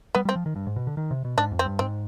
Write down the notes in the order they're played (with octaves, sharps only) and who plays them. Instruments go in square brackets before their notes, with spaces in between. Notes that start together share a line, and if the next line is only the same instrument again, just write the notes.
[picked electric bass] G3 [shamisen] B3
[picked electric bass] G3 [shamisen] C4
[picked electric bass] F3
D#3
G2
G#2
B2
D3
D#3
C3
B2
[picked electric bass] G#2 [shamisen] D4
[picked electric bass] F2
[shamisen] C4
[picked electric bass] G2
[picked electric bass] G#2 [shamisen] C4